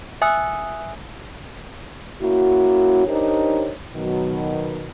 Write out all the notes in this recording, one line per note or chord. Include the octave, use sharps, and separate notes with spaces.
E5 G#5 D#6 E6 F#6
A#3 C#4 E4 F#4
D4 D#4 G4 A#4 C5 C#5
B2 D#3 F#3